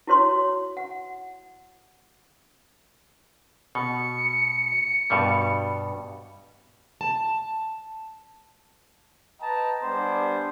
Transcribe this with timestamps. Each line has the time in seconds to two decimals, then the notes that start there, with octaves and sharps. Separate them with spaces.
0.07 E4 F#4 C#5 C6
0.77 F#5
3.75 B2 C#7
5.10 G2 B2 G3
7.01 A5
9.41 B4 D#5 G5 A5 A#5
9.83 G3 B3 D4 C5 G#5